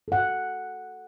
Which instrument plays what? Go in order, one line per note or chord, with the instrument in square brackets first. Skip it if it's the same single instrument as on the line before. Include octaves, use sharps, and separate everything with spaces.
[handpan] A4 F#5